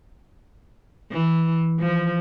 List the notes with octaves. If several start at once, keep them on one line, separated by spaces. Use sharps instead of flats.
E3
F3